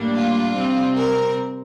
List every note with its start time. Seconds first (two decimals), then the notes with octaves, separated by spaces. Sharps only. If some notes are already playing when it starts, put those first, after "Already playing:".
Already playing: A2 G3 A#3 D4
0.13 F4
0.55 C3 G3 C4
0.95 A#4